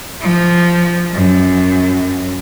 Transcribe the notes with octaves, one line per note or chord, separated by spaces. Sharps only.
F3
F#2